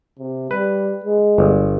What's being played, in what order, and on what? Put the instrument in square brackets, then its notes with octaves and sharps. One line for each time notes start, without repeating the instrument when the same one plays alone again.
[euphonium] C3
[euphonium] G3 [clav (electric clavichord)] B4
[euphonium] G#3
[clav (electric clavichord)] G1